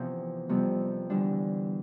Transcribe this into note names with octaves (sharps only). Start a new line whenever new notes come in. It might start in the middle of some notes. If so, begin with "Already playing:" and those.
Already playing: E2 C3 F3 B3
F2 C3 G3 B3
E2 D3 G3 D4